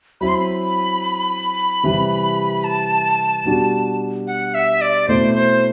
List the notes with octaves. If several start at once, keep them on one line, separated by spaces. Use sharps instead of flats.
F#3 C4 E4 B5
C6
B5
C3 E3 G3
A5
B2 G3 D4 F#4
F#5
E5
D5
B2 A3 C4 E4 C5
C5